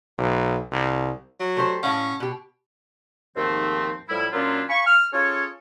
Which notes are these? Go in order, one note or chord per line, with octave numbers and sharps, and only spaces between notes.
B1
C2
F#3
A3 G4 C5
A2 C#4 F5 F#5
B2 G4
D#2 G#2 F3 A3 C4
A2 F3 G3 E4
A#2 F#3 C#4 D4 E4 F4
F5 G#5 B5 C#6
F6
C#4 F4 G#4 A4 C#5